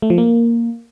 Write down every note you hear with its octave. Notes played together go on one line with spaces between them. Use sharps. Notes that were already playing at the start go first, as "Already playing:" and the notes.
A3
F3
A#3